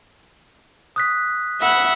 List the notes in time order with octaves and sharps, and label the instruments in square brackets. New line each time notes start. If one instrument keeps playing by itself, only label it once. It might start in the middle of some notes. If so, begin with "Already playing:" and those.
[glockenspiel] D#6 F#6 B6
[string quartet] E5 F#5 B5